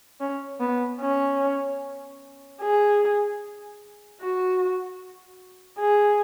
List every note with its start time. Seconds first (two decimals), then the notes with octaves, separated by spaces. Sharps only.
0.21 C#4
0.61 B3
1.01 C#4
2.61 G#4
4.21 F#4
5.80 G#4